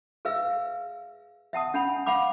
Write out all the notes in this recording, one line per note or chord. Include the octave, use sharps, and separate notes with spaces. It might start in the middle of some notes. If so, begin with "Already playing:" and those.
G#4 B4 E5 F5 E6
E5 F#5 A5 D#6
C#4 F#5 G#5 B5
F5 F#5 B5 D6